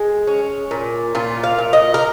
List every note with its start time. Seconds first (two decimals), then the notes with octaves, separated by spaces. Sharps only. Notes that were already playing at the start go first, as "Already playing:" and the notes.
Already playing: G#3 G#4
0.27 C#4
0.71 A#2
1.15 A#2 F4
1.44 F5
1.59 A#2
1.73 D#5
1.94 A#4